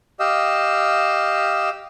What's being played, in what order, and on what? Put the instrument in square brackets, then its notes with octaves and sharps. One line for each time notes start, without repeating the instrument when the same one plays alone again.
[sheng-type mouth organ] G4 D#5 F5 E6